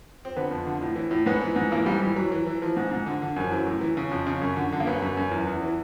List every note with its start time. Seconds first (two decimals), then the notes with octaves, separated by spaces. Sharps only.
0.25 C4
0.36 D3 B3
0.51 F2
0.66 D3
0.81 A2
0.96 E3
1.11 A2
1.26 G#2 B3
1.41 E3
1.56 G#2
1.71 E3 A#3
1.86 G#2 G3
2.02 E3 G3
2.16 E3 F#3
2.32 E3
2.46 E3
2.62 E3 F3
2.77 G#2
2.91 G#2
3.06 D3
3.22 D3
3.36 F#2 F3
3.51 E3 F#3
3.66 A2
3.81 E3
3.97 C#3
4.11 F2
4.27 C#3
4.42 F#2
4.56 D3
4.72 D3
4.80 A#3
4.87 F#2 B3
5.02 F#2
5.17 F#2
5.31 E2
5.47 E2
5.62 E3